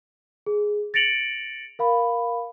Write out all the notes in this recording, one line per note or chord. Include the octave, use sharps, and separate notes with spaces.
G#4
A6 A#6 C#7 D7 F7 F#7
A#4 F5 B5